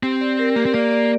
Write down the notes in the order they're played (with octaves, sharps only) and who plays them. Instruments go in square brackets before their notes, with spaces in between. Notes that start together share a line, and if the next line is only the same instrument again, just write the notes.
[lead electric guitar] C4 [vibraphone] G4
[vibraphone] D5
A#4
[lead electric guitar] A#3 [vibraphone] G4
[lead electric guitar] C4
[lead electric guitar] A#3 [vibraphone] D5
[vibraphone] D5